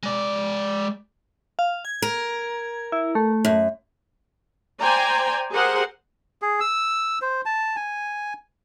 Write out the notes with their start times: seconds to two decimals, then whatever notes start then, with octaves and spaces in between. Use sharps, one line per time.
0.03 G#3 D5
1.59 F5
1.85 G#6
2.02 A#4
2.92 E4
3.15 A3
3.45 F#2
4.81 C5 D5 G5 G#5 A#5
5.51 G4 G#4 A#4 C5 F#5
6.42 G#4
6.61 E6
7.22 C5
7.46 A5
7.76 G#5